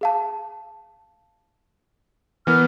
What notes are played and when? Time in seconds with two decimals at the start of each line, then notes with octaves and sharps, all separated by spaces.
0.01 G#4 F5 A5
2.47 E3 B3 A#4 F6